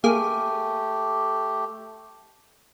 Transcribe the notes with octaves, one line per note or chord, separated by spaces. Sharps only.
A3 A#3 G4 G#4